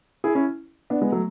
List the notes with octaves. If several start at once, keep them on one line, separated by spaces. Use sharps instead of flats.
E4 G#4
C#4 E4
B3 D4
G#3 B3
F#3 A3